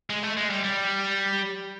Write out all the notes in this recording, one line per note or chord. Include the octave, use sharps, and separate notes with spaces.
G#3
A3
G#3
G3
G3